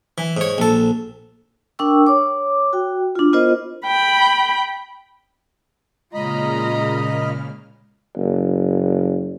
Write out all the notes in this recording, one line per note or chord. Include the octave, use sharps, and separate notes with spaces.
E3
G#2 C#5
A#1 A4
D4 A#4 G5 C#6 E6
C#5 D6
F#4 G5
D4 F4
B3 E4 F4 A#4 C5 D#5
G5 B5
A#2 C#3 G#3 F4 D#5 A#5 B5 F6
F#1